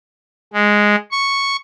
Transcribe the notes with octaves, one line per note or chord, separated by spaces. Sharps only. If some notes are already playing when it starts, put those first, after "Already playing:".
G#3
C#6